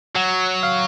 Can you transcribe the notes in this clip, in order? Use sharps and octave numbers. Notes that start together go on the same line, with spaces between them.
F#3 F#5
F5